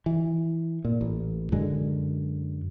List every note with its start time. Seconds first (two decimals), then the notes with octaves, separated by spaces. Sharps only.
0.06 E3
0.85 A#2
1.01 A1
1.52 F#2 D3 G#3